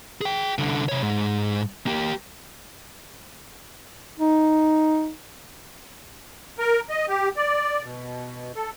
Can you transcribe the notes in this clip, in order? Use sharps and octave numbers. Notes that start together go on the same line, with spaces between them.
G#4 G5
C2 D3
C3 C#5
G#2
A#3 G4
D#4
A#4
D#5
G4
D5
B2
A4